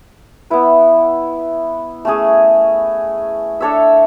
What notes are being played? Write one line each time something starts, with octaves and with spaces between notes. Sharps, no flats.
B3 E4 B4
A3 C#4 G#4
D4 A4 C#5 E5